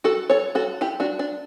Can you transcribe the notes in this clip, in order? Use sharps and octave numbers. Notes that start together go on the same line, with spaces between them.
F#4 A4
A4 C#5
F#4 A4
E4 G4
D4 F#4
D4